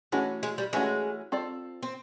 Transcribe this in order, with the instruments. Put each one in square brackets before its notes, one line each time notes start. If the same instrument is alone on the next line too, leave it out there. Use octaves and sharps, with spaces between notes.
[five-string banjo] E3 A3 C#4 F#4 [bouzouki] G#3
[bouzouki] G#3
G3
[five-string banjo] E3 A3 C#4 F#4 [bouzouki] G#3
[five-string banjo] C4 F4 A4 D5
[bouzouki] C4